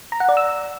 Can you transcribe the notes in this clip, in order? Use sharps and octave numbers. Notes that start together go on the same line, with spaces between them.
A#5
F#5
D5
E6